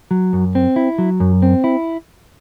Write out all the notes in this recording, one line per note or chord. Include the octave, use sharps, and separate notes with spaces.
F#3
F#2
C4
E4
F#3
F#2
C4
E4